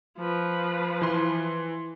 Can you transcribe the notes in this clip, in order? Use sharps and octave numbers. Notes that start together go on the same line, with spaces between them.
F3 B4
E3 C6